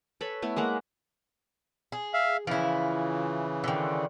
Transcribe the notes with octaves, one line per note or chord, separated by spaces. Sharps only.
A4 B4 C#5 B5
A3 B3 E4
G#3 A#3 F#5 A#5
G#4
E5 F5
C#3 E3 F3 E4
D3 D#3